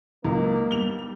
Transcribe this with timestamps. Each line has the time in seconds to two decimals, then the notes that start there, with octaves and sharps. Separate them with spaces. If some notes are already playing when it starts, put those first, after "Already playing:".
0.25 C#2 F#3 A#3 D#4
0.71 G1 G3 F7 G7